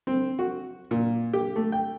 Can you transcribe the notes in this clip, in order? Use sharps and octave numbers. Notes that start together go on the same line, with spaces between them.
C4
F#4
A#2
G4
A3
G5